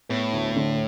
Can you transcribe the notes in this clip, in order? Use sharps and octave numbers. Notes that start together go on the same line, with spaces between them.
A2 B3
D2
D3